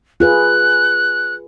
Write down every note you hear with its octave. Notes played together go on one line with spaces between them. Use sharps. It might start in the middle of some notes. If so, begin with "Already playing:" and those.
F4 G#4 B4 F#6